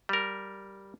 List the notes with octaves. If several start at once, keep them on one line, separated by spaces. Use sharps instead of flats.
G3 A#4